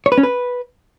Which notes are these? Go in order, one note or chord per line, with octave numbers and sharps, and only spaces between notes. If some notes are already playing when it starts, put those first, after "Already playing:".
C#5
B4
C#4
B4